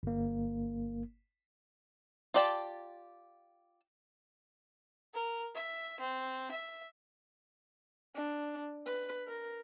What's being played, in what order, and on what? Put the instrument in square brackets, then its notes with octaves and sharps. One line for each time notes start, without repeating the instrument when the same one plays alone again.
[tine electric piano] G1 A#3
[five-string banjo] F4 G4 D5 G5 A5
[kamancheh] A#4
E5
C4
E5
[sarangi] D4
B4
A#4